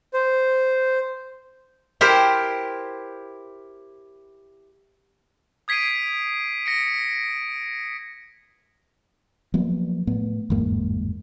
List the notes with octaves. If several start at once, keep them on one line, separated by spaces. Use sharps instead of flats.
C5
E4 G4 A#4 C5
D#6 G#6 B6 C7 D7 D#7
A#6 C#7 D7
F3 F#3 A#3 B3
A2 B3
G1 E2 G#2 A#3